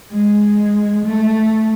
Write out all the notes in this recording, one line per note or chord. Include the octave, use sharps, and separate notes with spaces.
G#3
A3